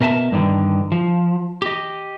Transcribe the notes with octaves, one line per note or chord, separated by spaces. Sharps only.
B2 A#4 E5 G#5 A5
G2 D3 D#3
F3
G4 D#5